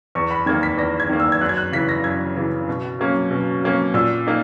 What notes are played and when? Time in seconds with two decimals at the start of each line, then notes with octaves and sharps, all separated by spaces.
0.15 E2 C#6
0.31 B5
0.46 D#3 A#3 G#6
0.63 B6
0.78 E2 A#6
1.00 G#6
1.10 D#3 A#3
1.20 E6
1.32 G#6
1.41 F#2 F#6
1.49 G#6
1.58 F#6
1.72 C#3 E3 B6
1.89 A#6
2.04 F#2 G#6
2.36 C#3 E3
2.68 B2
2.99 F#3 A#3 C#4
3.31 B2
3.63 F#3 A#3 C#4
3.94 A#2 E6
4.27 A#3 D#4